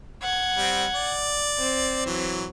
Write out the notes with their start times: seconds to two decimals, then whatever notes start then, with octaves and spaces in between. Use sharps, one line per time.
0.22 F#5 G#6
0.57 G3 C4
0.94 D5
1.57 C4
2.06 E3 F#3